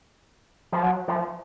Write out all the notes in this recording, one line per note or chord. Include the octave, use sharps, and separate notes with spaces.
F3
F#3
F3